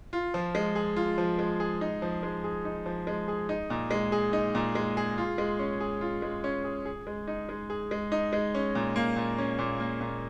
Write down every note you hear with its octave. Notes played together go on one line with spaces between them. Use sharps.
F4
F3
G#3
G#4
F4
F3
G#3
G#4
D#4
F3
G#3
G#4
D#4
F3
G#3
G#4
D#4
A#2
G#3
G#4
D#4
A#2
G#3
G#4
F4
G#3
C#4
G#4
F4
G#3
C#4
G#4
G#4
G#3
D#4
G#3
G#4
G#3
D#4
G#3
C#4
A#2
A#3
A#2
C#4
A#2
A#3
A#2